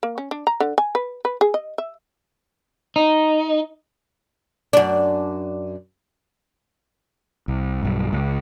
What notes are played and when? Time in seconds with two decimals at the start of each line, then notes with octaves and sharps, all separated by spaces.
0.03 A#3
0.18 C#4
0.31 D4
0.47 A#5
0.60 D3
0.78 G#5
0.95 B4
1.25 B4
1.41 G#4
1.54 D#5
1.78 E5
2.96 D#4
4.73 F#2 D4
7.48 C2
7.83 B1 G2
8.13 C#2